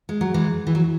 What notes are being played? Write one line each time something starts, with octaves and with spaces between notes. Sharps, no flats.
G#3
F#3
E3 G#3
E3
F#3